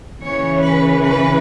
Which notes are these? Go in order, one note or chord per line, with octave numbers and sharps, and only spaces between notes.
C#3 E3 C#4 C#5
B4
B4